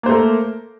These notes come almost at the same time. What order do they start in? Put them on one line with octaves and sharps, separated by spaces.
A#3 C5 A3 A#4